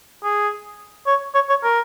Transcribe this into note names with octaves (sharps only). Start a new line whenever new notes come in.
G#4
C#5
C#5
C#5
A#4